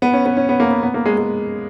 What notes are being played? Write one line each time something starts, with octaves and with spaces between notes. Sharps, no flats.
B3
C#4
B3
C#4
B3
A#3
B3
B3
A#3
G#3
G#3